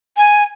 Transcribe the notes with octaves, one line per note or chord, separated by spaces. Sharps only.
G#5